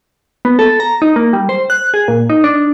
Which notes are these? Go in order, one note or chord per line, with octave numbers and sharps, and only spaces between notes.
B3
A4
A#5
D#4
A#3
G3
C5
F#6
G#4
A#2
D#4
D4